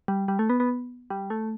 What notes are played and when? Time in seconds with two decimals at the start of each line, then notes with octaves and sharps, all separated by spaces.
0.08 G3
0.28 G3
0.39 A3
0.49 B3
0.60 B3
1.10 G3
1.30 A3